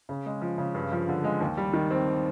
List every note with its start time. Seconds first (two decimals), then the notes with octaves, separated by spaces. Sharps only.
0.09 C#3
0.26 G#3
0.41 F3
0.58 C#3
0.74 G2
0.92 F3
1.09 D3
1.24 G#3
1.41 D#2
1.57 G3
1.73 D#3
1.91 C4